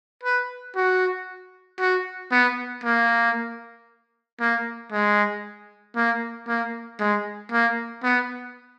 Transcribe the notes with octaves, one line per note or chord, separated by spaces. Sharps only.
B4
F#4
F#4
B3
A#3
A#3
G#3
A#3
A#3
G#3
A#3
B3